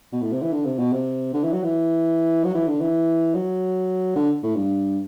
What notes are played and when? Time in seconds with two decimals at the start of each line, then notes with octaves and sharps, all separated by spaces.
0.12 B2
0.22 A2
0.32 C3
0.42 E3
0.52 D3
0.65 C3
0.79 B2
0.92 C3
1.34 D3
1.43 E3
1.53 F#3
1.63 E3
2.44 F#3
2.55 E3
2.68 D3
2.80 E3
3.35 F#3
4.16 D3
4.43 A2
4.56 G2